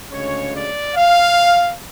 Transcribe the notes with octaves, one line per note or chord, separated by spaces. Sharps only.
D2 C#3 G#3 C#4 C#5
D5
F5